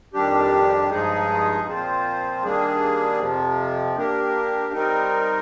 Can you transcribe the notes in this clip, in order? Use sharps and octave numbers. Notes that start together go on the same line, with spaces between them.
F2 D#3 G3 D4 G4
G2 F3 G#3 D#4 G#4
A#2 F3 C4 F4 C5
D#3 G3 A#3 D4 G#4
F2 C3 F3
A#3 D4 G4 A#4
G3 C4 D#4 A#4